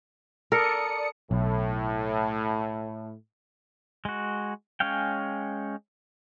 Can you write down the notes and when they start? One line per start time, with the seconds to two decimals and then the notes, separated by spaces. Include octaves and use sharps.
0.52 A4 A#4 D5 D#6 C#7
1.31 B1 A2
4.05 G#3 F#4
4.80 G#3 C#4 C#5 F5 G5